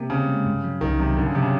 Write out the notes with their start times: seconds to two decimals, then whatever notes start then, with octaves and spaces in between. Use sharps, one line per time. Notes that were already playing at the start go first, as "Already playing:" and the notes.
Already playing: C3 A#3
0.10 C#3 C4
0.28 G#3
0.46 G2
0.64 F#3
0.81 C2 D#3
0.99 C3 F#3
1.17 G2 D3
1.26 C#3
1.35 C3 F#3
1.43 C#3